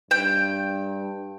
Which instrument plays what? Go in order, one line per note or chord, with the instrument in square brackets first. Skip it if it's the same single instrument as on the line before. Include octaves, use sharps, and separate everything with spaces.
[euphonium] G2 [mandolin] G5